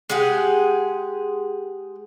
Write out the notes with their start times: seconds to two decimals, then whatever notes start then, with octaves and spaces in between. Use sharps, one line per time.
0.09 G#3 G4 G#4 F#5